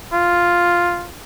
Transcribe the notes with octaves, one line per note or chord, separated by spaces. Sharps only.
F4